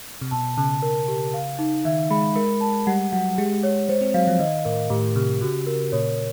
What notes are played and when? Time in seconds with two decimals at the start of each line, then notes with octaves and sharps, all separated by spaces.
0.21 C3
0.31 B2 A5
0.57 C#3 A5
0.82 A#4
1.08 G4
1.34 F5
1.59 D#4
1.85 D#3 E5
2.10 G#3 B5
2.35 G#3 A#4
2.61 A5
2.87 G3 F#5
3.12 F#3 F#5
3.38 G#3 G4
3.63 C#5
3.88 G#3 C5
4.01 C4
4.14 F#3 F5
4.27 F3
4.39 D#3 D#5
4.65 A2 A#4
4.90 A2 G4
5.16 C3 G4
5.41 C#3 F#4
5.67 A#4
5.92 A#2 C#5